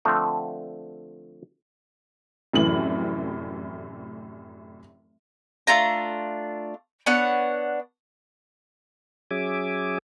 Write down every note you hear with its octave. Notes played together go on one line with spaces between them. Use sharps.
D3 F3 A3 C4
F1 F#2 A2 E3 F#7
A3 D4 F4 A#5
B3 D4 C#5 F#5
F#3 C#4 G#4 E5 G#5 D6